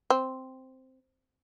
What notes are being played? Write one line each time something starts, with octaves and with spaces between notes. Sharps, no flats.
C4